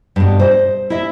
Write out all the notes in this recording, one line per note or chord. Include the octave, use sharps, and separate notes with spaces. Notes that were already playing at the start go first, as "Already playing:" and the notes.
G2 B2
C5 D#5
E4 D#5 E5